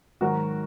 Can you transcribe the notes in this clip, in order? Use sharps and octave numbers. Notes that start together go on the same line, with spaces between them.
G#2 D#3 F#3 F#4 A#4